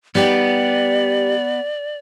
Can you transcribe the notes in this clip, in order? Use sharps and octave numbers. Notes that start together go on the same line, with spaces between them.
G3 B3 D#4 G4 D5